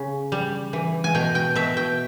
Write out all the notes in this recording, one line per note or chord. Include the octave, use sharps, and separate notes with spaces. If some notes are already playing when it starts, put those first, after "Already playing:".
Already playing: C#3
G3
E3
G#5
B2 G5
G5
B2 E5
G5